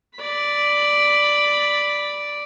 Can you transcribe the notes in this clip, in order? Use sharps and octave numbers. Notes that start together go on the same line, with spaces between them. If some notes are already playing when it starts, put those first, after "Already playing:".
D5 B5